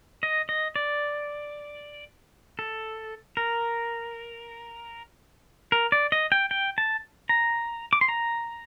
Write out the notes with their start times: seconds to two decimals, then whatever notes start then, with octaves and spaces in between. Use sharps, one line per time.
0.23 D#5
0.49 D#5
0.76 D5
2.59 A4
3.37 A#4
5.72 A#4
5.92 D5
6.12 D#5
6.32 G5
6.51 G5
6.78 A5
7.29 A#5
7.93 D6
8.01 C6
8.08 A#5